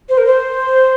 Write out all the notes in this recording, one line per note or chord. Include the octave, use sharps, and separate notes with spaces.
C5
A#4
C5